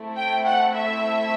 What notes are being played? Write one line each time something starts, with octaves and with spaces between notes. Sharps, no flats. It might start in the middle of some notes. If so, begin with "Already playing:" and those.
Already playing: A3 C4 E4
G5
F#5
E5